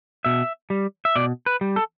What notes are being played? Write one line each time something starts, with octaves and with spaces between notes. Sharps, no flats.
B2 E5
G3
E5
B2 D5
B4
G3
A4